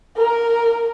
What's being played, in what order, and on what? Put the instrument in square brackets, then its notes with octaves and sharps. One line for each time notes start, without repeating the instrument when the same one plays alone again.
[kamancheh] A#4